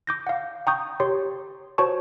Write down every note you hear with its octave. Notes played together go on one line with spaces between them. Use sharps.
D6 G6 A#6
F5 F#5
G5 A#5 C#6 D#6 G6
G4 C#5 C6
F#4 C5 C#5 A5 C#6